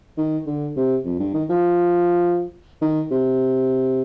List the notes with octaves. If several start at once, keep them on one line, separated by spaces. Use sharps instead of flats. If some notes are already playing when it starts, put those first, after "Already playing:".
D#3
D3
C3
F2
G2
D#3
F3
D#3
C3